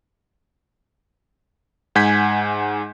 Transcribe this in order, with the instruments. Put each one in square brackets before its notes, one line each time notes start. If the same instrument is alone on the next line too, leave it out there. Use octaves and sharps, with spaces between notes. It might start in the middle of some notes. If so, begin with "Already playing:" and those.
[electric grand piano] G#2 F#5 G#5 G6 G#6 B6